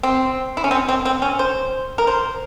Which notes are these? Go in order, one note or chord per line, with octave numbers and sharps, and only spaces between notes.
C4
E4
C#4
C4
C4
C4
C#4
C5
A#4
C5